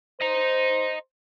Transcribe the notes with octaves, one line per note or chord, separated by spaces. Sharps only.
C5 D#5 A#5